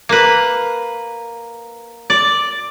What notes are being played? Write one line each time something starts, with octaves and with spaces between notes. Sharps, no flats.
A#3 B4
D5